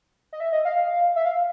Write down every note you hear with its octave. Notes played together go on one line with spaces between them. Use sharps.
D#5
E5
D#5
F5
E5
F5